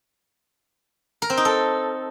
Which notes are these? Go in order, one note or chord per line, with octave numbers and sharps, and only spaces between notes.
A#4
C4
D#4
A4